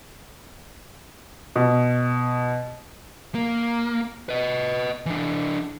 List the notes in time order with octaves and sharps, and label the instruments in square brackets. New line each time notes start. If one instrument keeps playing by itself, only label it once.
[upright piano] B2
[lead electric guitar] A#3
B4 D#5
E3 D4